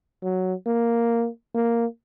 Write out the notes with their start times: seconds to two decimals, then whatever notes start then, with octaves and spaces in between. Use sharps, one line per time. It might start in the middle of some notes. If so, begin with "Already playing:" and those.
0.23 F#3
0.66 A#3
1.55 A#3